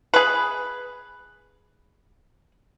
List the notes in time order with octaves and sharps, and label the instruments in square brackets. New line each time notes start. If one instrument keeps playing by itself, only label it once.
[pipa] G#4 B4